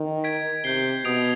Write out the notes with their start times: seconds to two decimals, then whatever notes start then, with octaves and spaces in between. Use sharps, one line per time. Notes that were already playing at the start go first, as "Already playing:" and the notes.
Already playing: D#3
0.24 G#6 B6 D7
0.64 C3 G6 C7 G7
1.05 B2 D#6 G#6 D7 F7